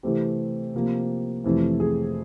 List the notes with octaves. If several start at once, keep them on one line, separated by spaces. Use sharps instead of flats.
C3 E3 A3 C4 G4
C3 F3 A#3
F2 C3 E3 A3
G#4